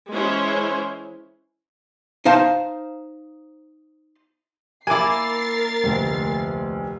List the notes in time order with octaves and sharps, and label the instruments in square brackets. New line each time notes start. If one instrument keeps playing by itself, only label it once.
[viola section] E3 G#3 C#4 E4 C5 C#5
[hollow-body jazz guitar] D#4 C5 F5 A5
[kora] A#3 E4 [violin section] A#4 A6 C7 [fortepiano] G#5 D6
[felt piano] F1 D2